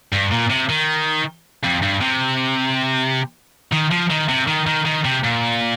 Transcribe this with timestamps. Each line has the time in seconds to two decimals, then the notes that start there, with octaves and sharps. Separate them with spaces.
0.13 G2
0.31 A#2
0.50 C3
0.70 D#3
1.64 F2
1.83 G2
2.01 C3
3.73 D#3
3.92 F3
4.10 D#3
4.29 C3
4.48 D#3
4.67 D#3
4.86 D#3
5.05 C3
5.24 A#2